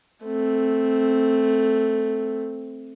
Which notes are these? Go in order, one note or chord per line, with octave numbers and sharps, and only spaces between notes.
A3 C4